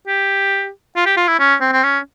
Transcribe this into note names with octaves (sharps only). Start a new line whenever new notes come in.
G4
F4
G4
F4
E4
C#4
C4
C4
C#4